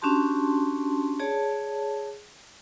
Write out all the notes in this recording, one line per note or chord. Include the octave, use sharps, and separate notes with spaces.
C#4 D4 F#4 G4 A5 C6
G#4 C#5 D5 A5